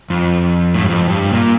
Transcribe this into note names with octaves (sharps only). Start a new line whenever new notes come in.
F2
A2
G2
F2
G2
A#2